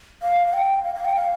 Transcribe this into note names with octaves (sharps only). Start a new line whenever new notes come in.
F5
F5
G5
F5
F5
G5
F5